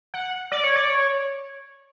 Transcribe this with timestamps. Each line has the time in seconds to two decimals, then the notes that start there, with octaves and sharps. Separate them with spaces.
0.14 F#5
0.52 D5
0.64 C#5
0.76 D5
0.90 C#5